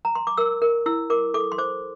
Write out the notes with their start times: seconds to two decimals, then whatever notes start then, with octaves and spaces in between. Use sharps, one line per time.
0.05 A#5
0.15 C6
0.27 D6
0.37 A#4 E6
0.62 A#4
0.86 E4 E6
1.10 A#4 D6
1.34 A4 D6
1.52 C6
1.58 C5 D6